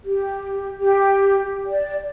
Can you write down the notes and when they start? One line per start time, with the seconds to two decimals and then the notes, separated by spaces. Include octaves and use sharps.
0.04 G4
0.78 G4
1.67 D5